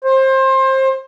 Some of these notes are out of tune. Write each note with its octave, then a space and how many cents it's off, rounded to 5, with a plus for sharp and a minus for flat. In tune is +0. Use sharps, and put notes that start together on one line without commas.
C5 +25